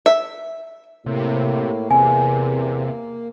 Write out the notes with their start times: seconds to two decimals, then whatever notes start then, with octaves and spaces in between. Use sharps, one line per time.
0.06 E5
1.06 A2 C3 A#3
1.91 E2 C3 G#5